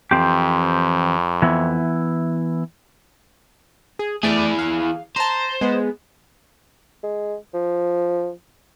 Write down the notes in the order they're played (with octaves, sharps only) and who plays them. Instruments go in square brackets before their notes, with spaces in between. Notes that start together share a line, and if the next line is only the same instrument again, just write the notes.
[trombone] F2 [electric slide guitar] E3 C4 G4
[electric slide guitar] E3 B3 E4
[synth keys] G#4
[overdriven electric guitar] E3 G#4 [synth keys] A3 D5
[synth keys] F5
[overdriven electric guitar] C5 [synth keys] A5 A#5
[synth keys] G#3 B3
[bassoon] G#3
F3